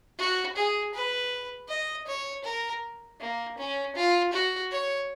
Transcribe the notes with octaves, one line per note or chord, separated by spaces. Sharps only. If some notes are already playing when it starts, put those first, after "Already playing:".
F#4
G#4
B4
D#5
C#5
A#4
A#3
C#4
F4
F#4
C#5